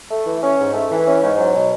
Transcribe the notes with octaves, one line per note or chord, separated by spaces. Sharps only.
A3
E3
C#4
G#2
A3
E3
C#4
G#2
F#3
B2